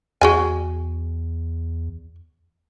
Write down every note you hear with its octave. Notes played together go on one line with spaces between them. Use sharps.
E2 F#4 G#4 G#5